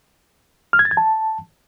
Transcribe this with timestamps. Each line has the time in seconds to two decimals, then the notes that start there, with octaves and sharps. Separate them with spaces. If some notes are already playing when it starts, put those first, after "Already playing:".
0.73 F6
0.79 G#6
0.85 A6
0.91 G#6
0.97 A5